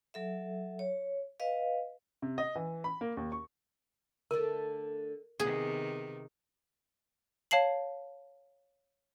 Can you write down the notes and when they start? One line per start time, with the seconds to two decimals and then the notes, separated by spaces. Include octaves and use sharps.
0.14 F#3 A4 E5
0.79 C#5
1.40 B4 D#5 F5
2.22 C3
2.38 D#5
2.56 E3
2.84 B5
3.01 A#3
3.17 D#2
3.32 C#6
4.31 D3 A3 D4 A#4
5.40 C3 D#3 B3 G#4
7.51 C#5 F5 A5 C7 F#7